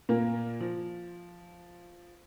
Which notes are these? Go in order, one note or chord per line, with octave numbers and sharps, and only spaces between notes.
A#2 A#3
F3